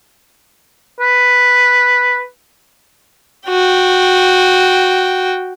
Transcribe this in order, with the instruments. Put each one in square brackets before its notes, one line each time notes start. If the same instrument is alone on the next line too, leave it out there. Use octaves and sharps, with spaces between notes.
[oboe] B4
[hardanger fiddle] F#4 G5